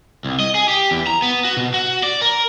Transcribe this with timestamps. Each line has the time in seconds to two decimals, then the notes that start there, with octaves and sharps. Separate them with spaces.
0.24 C2
0.39 D#5
0.55 G#4
0.68 G4
0.91 E2
1.07 A#5
1.22 B3
1.45 F#4
1.57 B2
1.74 F#4
2.03 D5
2.22 A#4